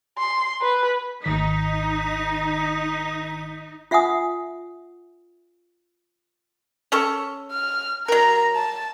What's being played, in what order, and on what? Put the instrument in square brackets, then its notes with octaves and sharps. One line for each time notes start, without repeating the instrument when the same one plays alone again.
[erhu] C6
B4
[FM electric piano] G#1 D#3 B6 [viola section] D#4
[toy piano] F4 E5 F#5 G#5 D#6
[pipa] C#4 A4 C#6
[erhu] F6
[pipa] F#3 A#4 [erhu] A#5
[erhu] A5